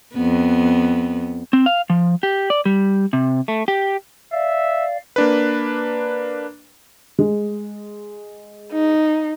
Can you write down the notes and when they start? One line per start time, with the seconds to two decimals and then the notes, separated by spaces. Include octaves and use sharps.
0.14 F2 B3
1.53 C4
1.66 F5
1.90 F3
2.23 G4
2.50 D5
2.66 G3
3.13 C3
3.48 A3
3.68 G4
4.32 D5 E5 F5
5.16 A#3 D4 B4
7.19 G#3
8.72 D#4